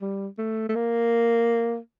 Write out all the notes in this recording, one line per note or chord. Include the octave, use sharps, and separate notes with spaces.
G3
A3
A3
A#3